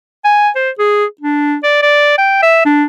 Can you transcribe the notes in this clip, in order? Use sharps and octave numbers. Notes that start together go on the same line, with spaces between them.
G#5
C5
G#4
D4
D5
D5
G5
E5
D4